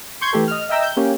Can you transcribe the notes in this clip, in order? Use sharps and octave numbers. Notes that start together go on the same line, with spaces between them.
C6 C#6 G6 G#6
E3 A3 G4 A4
D#5 F6
D#5 E5 G5 A#5 E6
G6
A#3 C#4 G4